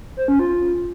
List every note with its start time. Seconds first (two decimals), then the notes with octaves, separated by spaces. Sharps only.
0.17 C5
0.28 C#4
0.39 F4